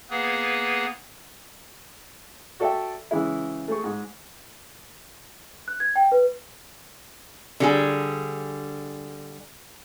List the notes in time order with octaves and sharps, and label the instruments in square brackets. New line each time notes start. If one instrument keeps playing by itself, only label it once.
[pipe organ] A#3 B3 G#4 B4
[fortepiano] F#4 A4 D5 E5 G5
C#3 E3 G#3 E4
A3 G#4 C#6
G#2
[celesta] F#6
G#6
G5
B4
[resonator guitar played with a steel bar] D3 G3 G#4